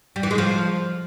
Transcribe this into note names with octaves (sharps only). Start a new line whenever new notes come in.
G3
E3
G#3
F3